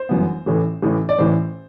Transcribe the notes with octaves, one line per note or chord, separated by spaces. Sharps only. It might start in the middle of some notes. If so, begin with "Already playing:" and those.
Already playing: C5
G1 F#2 E3 B3
A1 A2 E3 A3
A1 A2 E3 A3
D5
A1 A2 E3 A3 C5